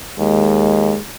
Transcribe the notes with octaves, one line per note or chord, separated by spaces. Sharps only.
D#2 G#3